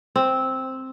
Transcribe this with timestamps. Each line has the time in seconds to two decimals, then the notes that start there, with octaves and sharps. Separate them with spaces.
0.16 C4